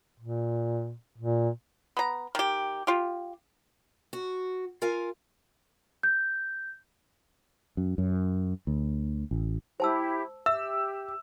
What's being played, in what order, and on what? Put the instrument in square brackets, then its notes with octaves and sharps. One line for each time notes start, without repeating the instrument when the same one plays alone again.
[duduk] A#2
A#2
[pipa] B3 A#5
D#3 G4
F4 G4
[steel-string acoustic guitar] F#4
F4 A#4 F5 G#5
[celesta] G6
[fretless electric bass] F#2
F#2
D2
A1
[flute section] E4 G4 [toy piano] C5 A5 E6
[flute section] G4 [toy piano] E5 [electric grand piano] E6